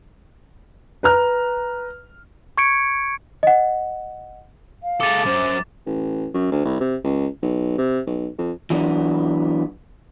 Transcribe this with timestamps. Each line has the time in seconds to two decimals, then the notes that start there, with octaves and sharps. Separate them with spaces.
1.03 B4 A#5 F6
2.58 C#6 G#6 C#7 D7
3.43 D#5 F#5
4.83 F5
5.01 G#3 A4 D6 A6
5.26 F#2 C5
5.86 A1
6.34 F#2
6.52 D2
6.65 C2
6.80 C3
7.04 C#2
7.42 B1
7.78 C3
8.07 B1
8.38 F2
8.70 E3 F#3 B3 D4